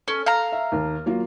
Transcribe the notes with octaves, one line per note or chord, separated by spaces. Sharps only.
C#4 A4
F5 A#5
E5
D#2
F#3 A#3 F4